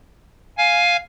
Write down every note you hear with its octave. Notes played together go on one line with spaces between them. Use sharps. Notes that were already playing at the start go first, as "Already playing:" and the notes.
F5 G#5